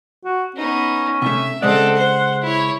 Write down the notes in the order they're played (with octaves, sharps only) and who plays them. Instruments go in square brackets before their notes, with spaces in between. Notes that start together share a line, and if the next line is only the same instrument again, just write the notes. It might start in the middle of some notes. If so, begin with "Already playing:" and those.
[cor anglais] F#4
[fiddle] B3 D#4 [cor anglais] C#4
[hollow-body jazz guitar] C3 A3 [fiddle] E5
[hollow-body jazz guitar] C#3 G#3 D5 [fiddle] C4 A4 [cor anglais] F#5
[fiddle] C5
E4 C#5